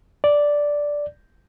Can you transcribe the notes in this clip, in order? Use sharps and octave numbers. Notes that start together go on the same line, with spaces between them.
D5